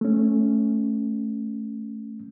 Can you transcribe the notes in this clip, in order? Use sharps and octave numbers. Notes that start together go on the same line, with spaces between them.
A3 C#4